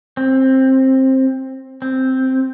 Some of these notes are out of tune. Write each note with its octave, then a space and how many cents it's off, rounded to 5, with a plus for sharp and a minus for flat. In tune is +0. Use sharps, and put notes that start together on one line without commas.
C4 +15
C4 +0